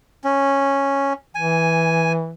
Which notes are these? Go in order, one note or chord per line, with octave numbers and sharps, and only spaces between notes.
C#4
E3 G#5